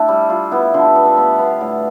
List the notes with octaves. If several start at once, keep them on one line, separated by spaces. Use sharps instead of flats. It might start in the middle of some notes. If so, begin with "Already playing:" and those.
Already playing: A3 D4 E4
G3
G3 F4
B3 E4
D3 F4
G4
B3 A4
B4
B3 E5
B3 F5
A2